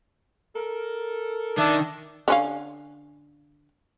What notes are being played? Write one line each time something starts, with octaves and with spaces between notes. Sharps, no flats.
A4 A#4
D#3 D4 E5
D3 C#4 F5